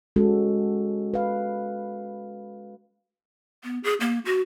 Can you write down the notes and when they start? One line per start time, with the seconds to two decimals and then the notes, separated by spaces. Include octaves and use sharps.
0.16 G#3 C#4 F#4 A4
1.14 B4 F5
3.64 B3
3.84 G#4
4.00 A#3
4.25 F#4